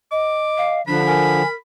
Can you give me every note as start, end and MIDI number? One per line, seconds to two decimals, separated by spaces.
0.12 0.79 75
0.12 0.78 86
0.57 0.82 77
0.87 1.42 50
0.87 1.42 53
0.87 1.01 62
0.87 1.55 83
1.07 1.54 70
1.07 1.47 80